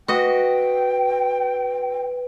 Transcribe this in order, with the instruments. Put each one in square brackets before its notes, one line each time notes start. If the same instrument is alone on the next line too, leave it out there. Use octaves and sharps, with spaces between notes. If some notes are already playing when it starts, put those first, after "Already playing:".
[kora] F#4 D#5 [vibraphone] B4 [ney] G5